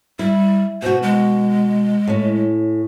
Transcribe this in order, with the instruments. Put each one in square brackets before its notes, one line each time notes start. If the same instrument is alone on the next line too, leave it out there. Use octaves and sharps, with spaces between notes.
[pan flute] G3 [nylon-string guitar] E4
[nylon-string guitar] B2 F#4 [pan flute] C5
[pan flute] G#3
[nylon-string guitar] A2 C#4